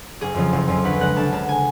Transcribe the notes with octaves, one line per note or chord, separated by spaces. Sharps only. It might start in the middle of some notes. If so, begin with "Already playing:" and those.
F#1 G#4
F2 C#3 F3
F#1
F2 C#3 F3
D2 B4
C#3 G#3 F#5
D2 A5
C#3 G#3 A5
G#5